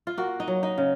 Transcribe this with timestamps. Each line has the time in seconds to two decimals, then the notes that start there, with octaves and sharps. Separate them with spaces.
0.07 F4
0.18 A#3 F#4
0.40 D#4
0.48 F#3
0.63 D#4
0.78 C#3